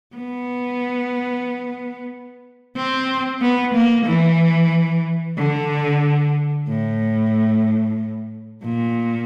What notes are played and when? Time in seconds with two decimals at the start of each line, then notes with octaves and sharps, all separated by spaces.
0.16 B3
2.76 C4
3.41 B3
3.75 A#3
4.06 E3
5.37 D3
6.68 A2
8.64 A#2